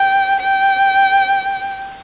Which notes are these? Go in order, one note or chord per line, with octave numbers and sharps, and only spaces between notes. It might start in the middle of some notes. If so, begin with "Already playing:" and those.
Already playing: G5
G5